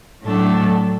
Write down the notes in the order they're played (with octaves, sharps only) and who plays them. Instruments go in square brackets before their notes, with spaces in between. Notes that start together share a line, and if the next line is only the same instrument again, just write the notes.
[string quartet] A2 F#3 A3 D4 A4